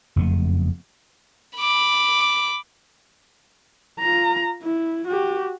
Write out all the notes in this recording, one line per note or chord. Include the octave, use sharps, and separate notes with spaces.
F#1 F2 A3 B3
B5 D6
F4 A#5
E4
F#4 G4